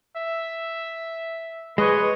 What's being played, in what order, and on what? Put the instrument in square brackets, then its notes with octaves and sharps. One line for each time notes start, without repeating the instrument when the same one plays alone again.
[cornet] E5
[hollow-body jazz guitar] G#3 [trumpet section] B4 [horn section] C#5 D#5